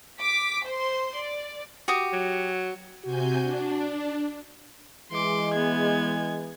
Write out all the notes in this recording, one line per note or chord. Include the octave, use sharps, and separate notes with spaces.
D6 B6
C5 C6
D5
F#4 G4 D#6
F#3
C3 F#4 G#5 G6
D4
E3 G#3 C6 D6
B3 G#6